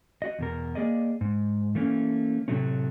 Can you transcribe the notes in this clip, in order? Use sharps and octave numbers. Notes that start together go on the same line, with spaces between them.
F#4 D#5
E2 B2 A#4
A#3 G#4 D5 D#5
G#2
E3 A3 A#3 C#4
A2 C3 E3 F#3 A3 C#4